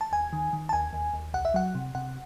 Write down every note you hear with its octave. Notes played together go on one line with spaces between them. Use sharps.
A5
D#2 G#5
D#3
D#3
A5
D#2 G#5
D#2
D#2
C2 F#5
E5
F#3 F#5
C3
C3 F#5